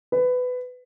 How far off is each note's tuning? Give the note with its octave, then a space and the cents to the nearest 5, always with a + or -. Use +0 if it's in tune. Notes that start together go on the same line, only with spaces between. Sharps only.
B4 +20